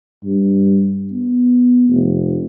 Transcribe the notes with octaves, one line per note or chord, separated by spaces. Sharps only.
G2
B3
F1